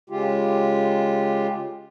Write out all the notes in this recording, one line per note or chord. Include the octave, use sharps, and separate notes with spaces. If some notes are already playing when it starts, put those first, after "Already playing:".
C#3 G#3 F4 G4